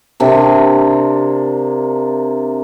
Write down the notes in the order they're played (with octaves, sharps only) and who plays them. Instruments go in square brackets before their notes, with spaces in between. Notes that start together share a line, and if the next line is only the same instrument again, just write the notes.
[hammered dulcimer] C3 A#3 D4